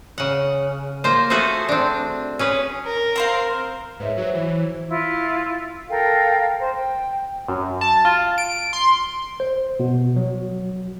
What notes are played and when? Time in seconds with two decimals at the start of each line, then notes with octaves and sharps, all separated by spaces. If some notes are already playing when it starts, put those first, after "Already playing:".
0.18 C#3 F#5
1.04 A#3 F4 C5
1.30 A3 F#4 G#4 A4 C5
1.69 C4 D4
2.39 C#4 G#4 B4
2.86 A#4
3.16 C4 C5 F5
4.00 G#2 B4 C#5 E5
4.17 F#3 C5 C#5
4.34 E3
4.88 E4 F4
5.89 A4 A#4 F5 G5
6.60 C5
6.75 G5
7.48 F#2
7.81 A5
8.05 F4
8.38 D7
8.73 C6
9.40 C5
9.80 B2
10.16 F#3